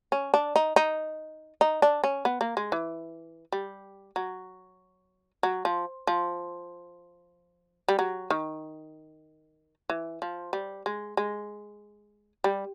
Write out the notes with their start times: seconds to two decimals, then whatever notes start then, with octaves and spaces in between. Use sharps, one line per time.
0.12 C#4
0.34 D4
0.56 D#4
0.76 D#4
1.61 D#4
1.82 D4
2.04 C#4
2.25 B3
2.41 A#3
2.57 G#3
2.72 E3
3.52 G3
4.16 F#3
5.43 F#3
5.65 F3
6.07 F3
7.88 G3
7.99 F#3
8.30 D#3
9.90 E3
10.22 F3
10.53 G3
10.86 G#3
11.17 G#3
12.44 G3